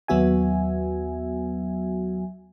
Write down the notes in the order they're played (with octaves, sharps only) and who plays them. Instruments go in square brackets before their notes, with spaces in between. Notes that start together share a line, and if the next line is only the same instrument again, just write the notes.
[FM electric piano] D#2 F#3 B3 F#4 E5 G#5